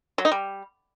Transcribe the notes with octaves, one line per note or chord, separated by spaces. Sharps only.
F#3
D#4
G3